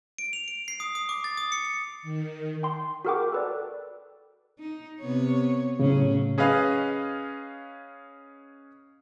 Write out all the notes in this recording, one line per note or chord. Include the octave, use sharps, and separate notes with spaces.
D7
F7
D7
C7
D#6
D#6
D6
A6
D#6
C#7
C#7
D#3
G5 C6
F#4 G#4 A#4 F#5 G5 D6
A4 B4 D5
D#4
C3 B3 C#5
A2 C#3 F#3 C#4 G#4
C#4 G#4 B4 D#5 F5